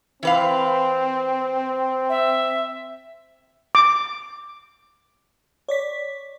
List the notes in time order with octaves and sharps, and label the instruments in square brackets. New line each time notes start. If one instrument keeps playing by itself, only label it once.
[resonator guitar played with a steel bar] E3 B4 F5 [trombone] C4
[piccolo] E5
[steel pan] D6
[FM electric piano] C#5 D5 B6